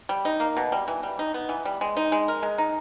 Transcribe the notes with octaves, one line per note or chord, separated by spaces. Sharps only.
G3
D#4
A#3
B2
G3
E3
G3
D#4
B3
E3
G3
G#3
D#4
G#3
A#4
G#3
D#4